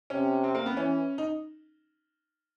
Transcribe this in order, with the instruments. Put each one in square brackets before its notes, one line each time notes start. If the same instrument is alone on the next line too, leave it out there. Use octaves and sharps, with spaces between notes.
[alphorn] C3 [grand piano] C#4
[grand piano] C4
A#3
B3
[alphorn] E3 [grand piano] C#4
[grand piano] D#4